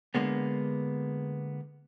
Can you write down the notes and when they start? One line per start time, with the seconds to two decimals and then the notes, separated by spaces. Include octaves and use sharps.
0.15 D3 G#3 A#3 B3